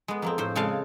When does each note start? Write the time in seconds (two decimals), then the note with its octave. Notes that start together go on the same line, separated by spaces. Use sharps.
0.08 G#3 B3
0.22 F2 A#3 C4
0.38 A2 C5
0.55 C#3 G#3 A4 D5 F5 A5